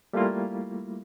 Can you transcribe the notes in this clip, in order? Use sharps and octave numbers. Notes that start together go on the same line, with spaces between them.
G3 A3 A#3 E4 F4